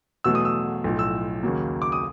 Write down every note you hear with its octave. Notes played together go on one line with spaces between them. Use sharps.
E2 B2 F#3 A3 E6
D#6
E6
B1 A2 F3
E6
D#2 C#3 F#3 A#3
D6
D#6